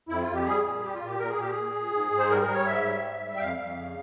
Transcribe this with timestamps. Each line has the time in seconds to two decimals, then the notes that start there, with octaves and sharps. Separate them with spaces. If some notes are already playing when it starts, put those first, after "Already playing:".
0.09 F2 E4
0.22 F4
0.28 F2
0.34 G4
0.45 G3 G#4
0.64 A#2
0.82 G3 G4
0.95 F4
1.01 A#2
1.07 G4
1.19 A#2 A#4
1.30 G#4
1.37 A#2 G4
1.52 A#2 G#4
1.74 A#2
1.92 G#2
2.11 G#2
2.19 C5
2.30 G3 A#4
2.42 A#4
2.48 G3
2.54 C#5
2.66 G#2 E5
2.85 G3
3.03 G#2
3.21 G3
3.36 G5
3.40 F2 F5
3.59 F2
3.77 C#3